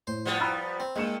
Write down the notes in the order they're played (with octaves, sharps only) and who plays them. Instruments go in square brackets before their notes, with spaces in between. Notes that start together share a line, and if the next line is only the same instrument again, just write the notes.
[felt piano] A2 [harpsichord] C5
[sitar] F3 G3 B3
[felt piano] A#5 B5 E6
[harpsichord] C4
[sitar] G2 [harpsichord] G#3 [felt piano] A#3 C#7 E7